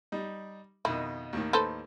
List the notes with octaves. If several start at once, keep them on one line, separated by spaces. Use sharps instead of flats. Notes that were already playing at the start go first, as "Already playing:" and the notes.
G3 D#4
F2 B2 D#3 E4
D#2 A2 D#3
A4 B4 C5